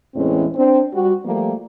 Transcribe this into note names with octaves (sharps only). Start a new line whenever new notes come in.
E2 A2 E3 G#3 C4 C#4
C4 D4
G3 F#4
F3 G3 A3 A#3